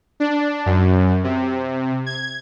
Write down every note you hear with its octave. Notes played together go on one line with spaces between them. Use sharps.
D4
F#2
C3
G#6